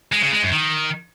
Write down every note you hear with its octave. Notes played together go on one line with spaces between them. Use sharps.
G#3
C#3
G#3
F#2
D#3